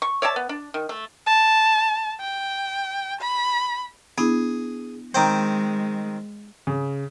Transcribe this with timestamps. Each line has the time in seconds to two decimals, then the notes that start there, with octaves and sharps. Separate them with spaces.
0.02 C#6
0.22 C#5 D5 E5 A5
0.36 B3
0.49 D4
0.74 D#3
0.89 A3
1.27 A5
2.21 G5
3.21 B5
4.18 B3 D4 E4 G#4
5.14 D#3 G#3 C4 C5 G5 A#5
6.67 C#3